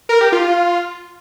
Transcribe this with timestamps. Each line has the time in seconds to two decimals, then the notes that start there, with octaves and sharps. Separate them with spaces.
0.09 A#4
0.21 G4
0.32 F4